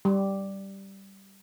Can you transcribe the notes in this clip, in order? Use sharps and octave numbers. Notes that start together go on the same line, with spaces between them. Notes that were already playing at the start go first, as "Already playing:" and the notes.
G3